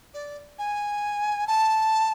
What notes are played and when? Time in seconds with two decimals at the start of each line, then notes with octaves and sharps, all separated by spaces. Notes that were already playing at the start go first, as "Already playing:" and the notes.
0.14 D5
0.58 G#5
1.47 A5